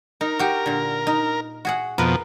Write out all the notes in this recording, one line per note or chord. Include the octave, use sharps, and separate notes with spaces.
D#4 A#4
F#4 G4
A#2 D3
D#4
F#4 G#4 F#5
F2 B2 A#4 B4